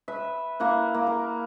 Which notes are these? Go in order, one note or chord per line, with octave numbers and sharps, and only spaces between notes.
B4 E5
A#3 E4 F#5
A#3
A#4